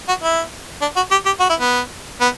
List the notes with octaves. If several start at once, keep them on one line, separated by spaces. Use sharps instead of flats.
F#4
E4
D4
F#4
G4
G4
F#4
E4
B3
B3